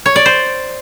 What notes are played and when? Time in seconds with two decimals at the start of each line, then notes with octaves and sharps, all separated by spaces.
0.06 C#5
0.16 D5
0.26 C5